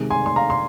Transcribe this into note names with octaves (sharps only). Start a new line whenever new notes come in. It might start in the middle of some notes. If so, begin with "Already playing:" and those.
Already playing: C3 D#3 G#3
G#5 C6
C6
F5 A#5
C6